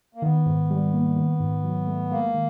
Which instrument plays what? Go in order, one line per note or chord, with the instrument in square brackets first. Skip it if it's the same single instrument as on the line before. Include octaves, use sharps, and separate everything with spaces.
[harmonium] A#3
[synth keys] D#3 [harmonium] B3
[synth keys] G#2
G3
A#3
D#3
G#2
F#3
A3
[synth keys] G#3 [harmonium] A#3
[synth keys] D#3